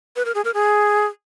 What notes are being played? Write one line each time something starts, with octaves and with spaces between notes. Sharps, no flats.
B4
A#4
G#4
A#4
G#4